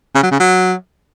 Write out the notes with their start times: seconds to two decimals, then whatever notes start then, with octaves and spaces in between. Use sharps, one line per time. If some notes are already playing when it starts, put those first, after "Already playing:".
0.15 C#3
0.23 F#3
0.31 C#3
0.40 F#3